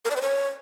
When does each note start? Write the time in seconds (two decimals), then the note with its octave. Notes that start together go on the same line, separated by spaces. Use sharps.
0.05 A#4
0.10 D5
0.16 C5
0.22 C#5